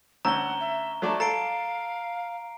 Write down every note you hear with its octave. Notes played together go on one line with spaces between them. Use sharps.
D2 C#4 F#5 A#5 E6 G7
E5
F#3 A3 D5 A5
A4 F5 A#5 C7 D7